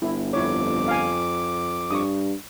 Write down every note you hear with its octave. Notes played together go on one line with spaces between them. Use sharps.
G1 E4
F2 E4 C#5 D6
F5 G#5
G2 C#6 D#6